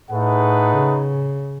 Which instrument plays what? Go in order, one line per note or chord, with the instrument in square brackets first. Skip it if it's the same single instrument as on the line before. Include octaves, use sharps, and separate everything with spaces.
[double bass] A2 [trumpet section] A3 D#4 G#4 B4 F#5
[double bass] C#3